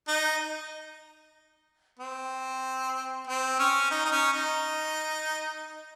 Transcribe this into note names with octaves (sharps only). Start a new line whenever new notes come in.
D#4
C4
C4
C#4
D#4
D#4
C#4
D#4